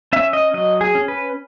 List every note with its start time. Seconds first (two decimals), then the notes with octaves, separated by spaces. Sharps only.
0.13 C#4 E5
0.33 D#5
0.54 F#3 D#5
0.81 G#4
0.95 C#4
1.08 B4